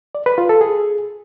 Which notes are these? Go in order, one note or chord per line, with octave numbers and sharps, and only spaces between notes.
D5
B4
F4
A4
G#4